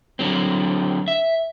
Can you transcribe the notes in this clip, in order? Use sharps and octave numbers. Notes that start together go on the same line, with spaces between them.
D3 F#3 C4
E5